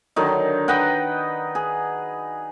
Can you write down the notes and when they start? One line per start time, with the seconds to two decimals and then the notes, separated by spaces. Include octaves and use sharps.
0.16 D3 D#3 F#3 D#4
0.68 B4 D#5 F#5 G5
1.55 G#4